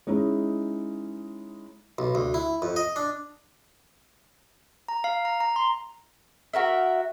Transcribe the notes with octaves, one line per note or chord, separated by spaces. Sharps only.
G#3 C#4 D#4 E4
B1
D2
E4
F2
D#5
D4
A#5
F5
A#5
A#5
C6
F#4 A#4 E5